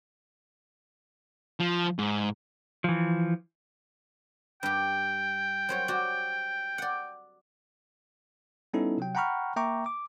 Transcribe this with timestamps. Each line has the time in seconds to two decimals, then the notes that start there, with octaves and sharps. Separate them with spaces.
1.60 F3
1.99 G#2
2.84 E3 F3
4.63 G2 G4 G5
5.69 F#3 C5 C#5
5.88 F#4 G4 D5
6.78 D5 F#5
8.74 G3 B3 C#4 D#4 E4 A4
8.98 C3 F#3 G5
9.15 F#5 G5 A#5 B5 C#6 F6
9.56 A#3 E5 G5 A#5 C#6 D6
9.86 D6